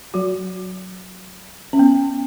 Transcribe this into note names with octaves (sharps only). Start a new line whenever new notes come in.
F#3 F#4
C#4
B3